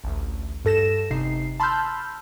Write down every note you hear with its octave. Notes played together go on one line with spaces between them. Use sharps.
A1 D2
G2 A4 A#6 E7
G1 C3 D#4 C7
A5 B5 C6 E6 F6 G6